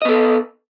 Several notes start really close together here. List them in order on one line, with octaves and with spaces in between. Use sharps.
D#5 B3 A4